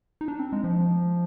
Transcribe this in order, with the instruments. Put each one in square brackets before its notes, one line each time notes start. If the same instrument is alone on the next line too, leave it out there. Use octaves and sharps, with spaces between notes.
[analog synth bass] D#4
D4
C4
G#3
F3